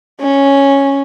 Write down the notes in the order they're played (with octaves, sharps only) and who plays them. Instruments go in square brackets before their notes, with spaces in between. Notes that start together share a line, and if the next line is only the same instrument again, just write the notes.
[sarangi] C#4